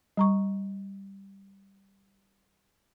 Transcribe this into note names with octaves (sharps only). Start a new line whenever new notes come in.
G3 A#5 C#6